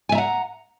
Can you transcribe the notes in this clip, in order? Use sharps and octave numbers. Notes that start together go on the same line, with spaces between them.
E5 F#5 G#5 A#5